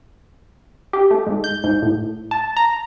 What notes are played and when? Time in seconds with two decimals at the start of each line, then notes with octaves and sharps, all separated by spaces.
0.93 G4
1.11 A3
1.26 G#2
1.44 G6
1.64 G#2
1.82 A2
2.31 A5
2.57 A#5